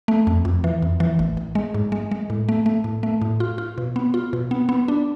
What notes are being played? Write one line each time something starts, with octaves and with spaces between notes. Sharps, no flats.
A3
F2
F2
E3
F2
E3
A1
A1
G#3
G#2
G#3
G#3
A2
A3
A3
A2
A3
A2
F4
F4
B2
B3
F4
B2
B3
B3
D4